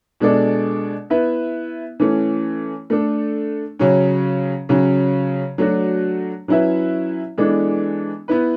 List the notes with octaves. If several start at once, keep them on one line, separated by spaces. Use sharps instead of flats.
B2 G#3 D4 A4 D5
B3 E4 B4 E5
E3 A3 C#4
A3 D4 A4
C#3 F#3 C#4
C#3 F#3 C#4
F#3 A3 D4 F#4
F#3 C#4 E4 B4 E5
E3 G#3 B3 D4 A4
B3 E4 B4